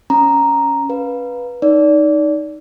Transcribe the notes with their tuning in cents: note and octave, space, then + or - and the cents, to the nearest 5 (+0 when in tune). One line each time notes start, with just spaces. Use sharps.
C#4 +0 A#5 +0
B4 -10 F5 +15
D#4 +0 D5 -25